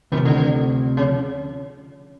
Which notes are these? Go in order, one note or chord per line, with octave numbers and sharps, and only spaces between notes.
D2 C3 D#3 F3
D3
C#3